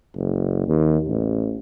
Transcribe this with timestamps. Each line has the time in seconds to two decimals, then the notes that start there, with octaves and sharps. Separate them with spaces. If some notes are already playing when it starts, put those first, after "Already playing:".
0.15 F#1
0.68 D#2
1.08 A1